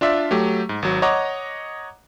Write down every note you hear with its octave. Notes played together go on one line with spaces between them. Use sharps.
D4 F4 D5 E5
F#3 A3 G4
G#2
G#1 F#3
C#5 D#5 F#5 A#5 D6